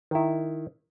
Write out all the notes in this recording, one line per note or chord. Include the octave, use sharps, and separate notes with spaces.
D#3 E4